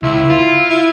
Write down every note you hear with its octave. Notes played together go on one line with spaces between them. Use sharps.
C#2 E4
F4
E4